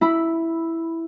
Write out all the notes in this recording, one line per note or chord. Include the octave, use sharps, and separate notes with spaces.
E4 B5